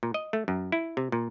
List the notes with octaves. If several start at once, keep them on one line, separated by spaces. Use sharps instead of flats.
A#2
D#5
A3
F#2
E4
C3
A#2